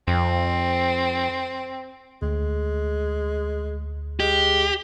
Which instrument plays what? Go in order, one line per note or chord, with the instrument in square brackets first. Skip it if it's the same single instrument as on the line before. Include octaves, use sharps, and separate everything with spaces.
[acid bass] F2 [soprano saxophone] C4
[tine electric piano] D2 [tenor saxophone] G#3
[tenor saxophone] G#3 [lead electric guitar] G4